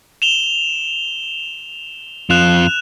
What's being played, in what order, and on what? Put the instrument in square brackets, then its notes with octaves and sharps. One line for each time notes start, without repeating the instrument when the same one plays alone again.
[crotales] E7 F7 G7
[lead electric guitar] F2 F4 [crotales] F#6 E7 F7